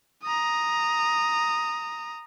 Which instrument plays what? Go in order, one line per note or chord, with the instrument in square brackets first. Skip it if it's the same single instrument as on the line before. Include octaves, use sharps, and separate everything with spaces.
[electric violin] A#5 D#6